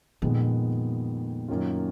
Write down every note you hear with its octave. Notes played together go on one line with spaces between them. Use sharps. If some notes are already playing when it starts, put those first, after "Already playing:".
F2 A#2 D#3 G#3 B3
F#2 D#3 A#3 C#4 F4